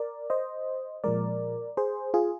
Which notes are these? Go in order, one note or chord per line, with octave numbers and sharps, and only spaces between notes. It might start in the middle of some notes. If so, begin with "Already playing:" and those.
Already playing: A#4 D5
C5 D#5
A#2 F3 G#3 A#4 D5
G#4 C5
F4 G#4